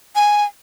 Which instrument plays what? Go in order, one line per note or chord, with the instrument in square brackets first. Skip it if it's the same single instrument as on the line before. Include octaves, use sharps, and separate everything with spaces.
[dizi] G#5